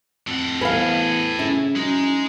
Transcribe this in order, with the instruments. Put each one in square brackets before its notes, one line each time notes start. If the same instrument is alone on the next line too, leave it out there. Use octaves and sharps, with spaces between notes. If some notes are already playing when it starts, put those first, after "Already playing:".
[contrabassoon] F2 [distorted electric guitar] A2 F#5
[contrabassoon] E2 [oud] B4 F5 [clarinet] G#5
[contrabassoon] C#3 [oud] E4
[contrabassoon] F#2 [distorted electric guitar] G#3 [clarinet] D#4